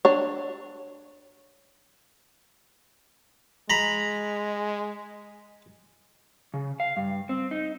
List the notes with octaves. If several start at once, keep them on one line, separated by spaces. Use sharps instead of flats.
D4 C#5
G#3 A#5 B5
C#3
F5
G2
C4
D#4